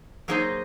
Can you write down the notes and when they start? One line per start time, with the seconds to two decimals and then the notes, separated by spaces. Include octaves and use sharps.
0.28 F#3 A#3 D#4 G#4 C5